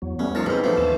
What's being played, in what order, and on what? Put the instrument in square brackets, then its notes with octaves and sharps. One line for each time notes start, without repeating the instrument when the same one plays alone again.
[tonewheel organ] E2 F#3
[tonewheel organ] G3 A3 B3 [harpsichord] C#4
[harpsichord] F3 C#5 A5 [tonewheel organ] D#4 F4 A#4
[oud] E3 B3 [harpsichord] G#3 C4
[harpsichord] F3 A3 [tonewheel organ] D4 C5
[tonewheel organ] D#2 C#4 A5